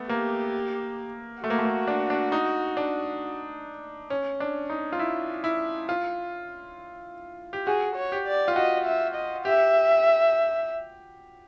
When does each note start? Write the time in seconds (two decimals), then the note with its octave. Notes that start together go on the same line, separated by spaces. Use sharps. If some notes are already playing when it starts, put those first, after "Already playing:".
Already playing: A3 B3
0.09 A#3 G4
1.43 A3 F#4
1.50 A#3
1.59 A3
1.65 A#3
1.88 D4
2.10 D4
2.32 D#4
2.77 D4
4.10 C#4
4.40 D4
4.70 D#4
4.92 F4
4.99 E4
5.44 E4
5.89 F4
7.53 G4
7.67 F#4 G#4
7.96 C#5
8.12 G4
8.27 D5
8.48 F4
8.56 F#4 D#5
8.86 E5
9.15 D#5
9.45 G4 E5